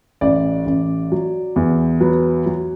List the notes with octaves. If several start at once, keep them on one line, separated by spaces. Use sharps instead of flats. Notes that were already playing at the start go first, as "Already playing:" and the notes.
A1 D5
A1
F#3
E2
F#3 B4
F#3